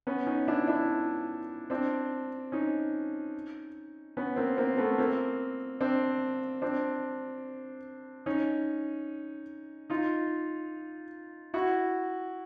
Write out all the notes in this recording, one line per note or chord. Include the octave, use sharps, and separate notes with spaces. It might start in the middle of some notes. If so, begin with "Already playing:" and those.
B3 C#4
C#4 D#4
D4 E4
D4 E4
C4 D4
C#4 D#4
B3 C#4
A#3 C4
A#3 C4
A3 B3
A#3 C4
C4 D4
C4 D4
C#4 D#4
D#4 F4
E4 F#4